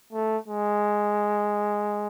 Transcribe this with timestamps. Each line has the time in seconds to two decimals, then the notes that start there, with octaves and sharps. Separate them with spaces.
0.12 A3
0.48 G#3